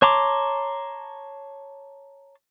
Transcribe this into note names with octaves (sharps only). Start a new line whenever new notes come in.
C#5 A5 A#5 C6 D6